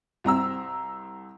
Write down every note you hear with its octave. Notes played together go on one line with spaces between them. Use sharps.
C2 C4 A#5 E6